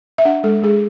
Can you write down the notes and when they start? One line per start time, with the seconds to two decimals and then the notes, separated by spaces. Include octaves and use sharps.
0.18 E5
0.25 D4 F#5
0.44 G#3 A4
0.62 G#3 G#4